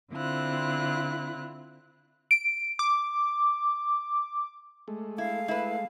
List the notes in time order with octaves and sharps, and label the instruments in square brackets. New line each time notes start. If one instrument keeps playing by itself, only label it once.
[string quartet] D3 C4 E4 F4 F#6
[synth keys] D7
D6
[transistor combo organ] G#3 A3
[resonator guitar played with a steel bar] E4 [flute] F5
[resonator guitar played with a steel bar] E4 B4